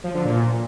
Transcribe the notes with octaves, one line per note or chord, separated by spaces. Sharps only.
F3
D3
A#2